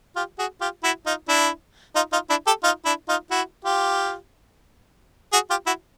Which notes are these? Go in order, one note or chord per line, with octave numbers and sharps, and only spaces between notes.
F4 G4
F#4 G#4
F4 G4
E4 F#4
D#4 F4
D4 E4
D#4 F4
D#4 F4
D4 E4
G4 A4
D#4 F4
D4 E4
D#4 F4
E4 F#4
F4 G4
F#4 G#4
F4 G4
E4 F#4